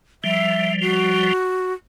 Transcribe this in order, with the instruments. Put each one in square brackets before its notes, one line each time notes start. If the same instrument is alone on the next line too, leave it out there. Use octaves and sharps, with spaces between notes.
[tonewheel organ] F3 G3 [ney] E5
[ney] F#4